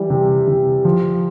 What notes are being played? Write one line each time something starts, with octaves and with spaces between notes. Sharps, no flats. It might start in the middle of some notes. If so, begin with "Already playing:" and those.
Already playing: E3 G3
C3
C3
F3